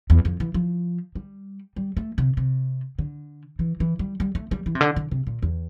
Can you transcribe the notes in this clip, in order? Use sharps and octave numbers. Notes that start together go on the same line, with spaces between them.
E2
F2
E3
F3
G3
G3
A3
C3
C3
D3
E3
E3
G3
G3
A3
G3
E3
C3
D3
D3
C3
A#2
E2